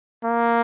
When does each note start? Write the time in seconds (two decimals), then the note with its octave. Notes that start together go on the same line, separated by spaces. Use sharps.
0.24 A#3